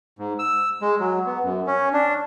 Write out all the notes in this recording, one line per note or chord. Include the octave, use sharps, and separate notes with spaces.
G#2
E6
G#3
F#3
B3
F#2
C#4
D4